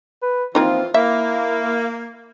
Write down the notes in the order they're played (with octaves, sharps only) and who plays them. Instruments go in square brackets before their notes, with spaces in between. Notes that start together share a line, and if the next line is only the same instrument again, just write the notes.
[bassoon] B4
[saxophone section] E3 F4 [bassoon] F3 [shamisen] A#3 C4 D#4
[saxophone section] A#3 [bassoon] E4 [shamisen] E5